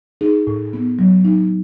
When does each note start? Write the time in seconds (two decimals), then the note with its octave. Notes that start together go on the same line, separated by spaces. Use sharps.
0.21 D#4 G#4
0.47 A2
0.73 B3
0.99 F#3
1.25 D#4